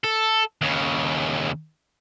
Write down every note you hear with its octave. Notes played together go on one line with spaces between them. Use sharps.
A4
D#2 C#3